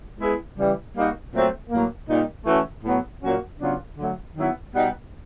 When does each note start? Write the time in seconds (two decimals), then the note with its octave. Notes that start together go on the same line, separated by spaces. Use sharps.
0.19 G#3 B3 E4 G#4
0.57 C#3 E3 G3
0.95 G3 A#3 D#4 F#4
1.32 A#2 F#3 A3 C4
1.70 A2 F#3 A#3
2.08 A#2 G3 A#3 D#4
2.46 E3 A3 C#4 F#4 A4
2.84 A2 F#3 B3
3.23 A#2 F#3 A#3 C#4 F#4
3.60 C#3 F#3 B3 D4 F4
3.97 D3 F#3 A3
4.36 D#3 F#3 B3 E4
4.73 B2 G3 B3 D#4